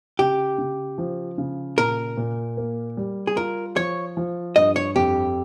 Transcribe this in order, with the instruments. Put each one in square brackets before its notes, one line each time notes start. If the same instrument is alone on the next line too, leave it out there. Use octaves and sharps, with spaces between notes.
[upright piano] C#3 [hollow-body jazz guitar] G4
[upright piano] C#3
F3
C#3
[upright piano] A#2 [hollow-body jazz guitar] A#4
[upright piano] A#2
A#3
G3
[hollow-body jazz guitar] G#4
[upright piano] F4 [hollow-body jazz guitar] A#4
[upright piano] F3 [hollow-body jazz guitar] C#5
[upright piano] F3
[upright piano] G2 [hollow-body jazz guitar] D#5
[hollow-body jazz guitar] C#5
[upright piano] F2 [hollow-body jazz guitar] G4